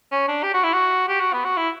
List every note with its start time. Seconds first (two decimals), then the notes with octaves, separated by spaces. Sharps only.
0.12 C#4
0.28 D4
0.43 G4
0.54 F#4
0.64 E4
0.73 F#4
1.09 G4
1.20 F#4
1.33 B3
1.45 F#4
1.57 E4